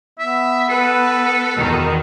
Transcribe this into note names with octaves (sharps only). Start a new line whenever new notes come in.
B3 E5
A4 B4
E2 B2 D#3